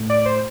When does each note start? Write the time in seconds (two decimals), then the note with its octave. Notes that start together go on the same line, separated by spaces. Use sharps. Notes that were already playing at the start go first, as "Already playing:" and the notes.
Already playing: A2
0.10 D5
0.26 C5